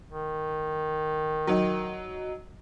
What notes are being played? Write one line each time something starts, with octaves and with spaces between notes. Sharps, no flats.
D#3
F#3 D#4